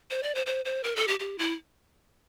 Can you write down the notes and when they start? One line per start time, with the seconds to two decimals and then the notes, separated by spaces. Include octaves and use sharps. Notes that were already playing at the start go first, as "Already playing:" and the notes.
0.11 C5
0.23 D5
0.35 C5
0.46 C5
0.65 C5
0.84 A#4
0.96 A4
1.08 G4
1.20 G4
1.38 E4